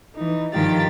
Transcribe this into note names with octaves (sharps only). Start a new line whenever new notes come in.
E3 D#4
G2 D#3 F3 F4 G4 A6